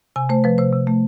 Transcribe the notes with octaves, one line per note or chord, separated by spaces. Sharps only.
C3 G#5
A3 C5
F3 B4
C3 C5
C3
A3